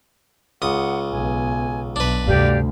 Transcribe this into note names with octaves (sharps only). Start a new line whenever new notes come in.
C#2 F#5 D#6
B1 G#5
B1 D4 B4
D2 G2 C3 G4 D5 F5